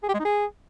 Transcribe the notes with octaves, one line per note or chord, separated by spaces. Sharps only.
G#4
G4
G#3
D#4
G#4